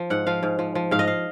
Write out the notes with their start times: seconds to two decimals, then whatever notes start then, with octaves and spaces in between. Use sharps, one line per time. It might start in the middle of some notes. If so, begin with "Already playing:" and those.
Already playing: F3
0.10 G#2 F#5
0.27 F3 F5
0.43 G#2
0.59 F3
0.75 F3
0.91 G#2 F5
0.99 D#5
1.07 F5